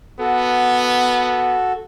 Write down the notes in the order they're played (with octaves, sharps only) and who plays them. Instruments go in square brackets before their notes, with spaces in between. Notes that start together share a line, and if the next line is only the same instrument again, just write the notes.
[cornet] B3 [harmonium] F#4 A4